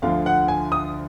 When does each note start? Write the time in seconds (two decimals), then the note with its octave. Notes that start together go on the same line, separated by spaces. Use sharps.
0.02 D2 D3 F3 F5
0.26 F#5
0.48 G#5
0.72 D#6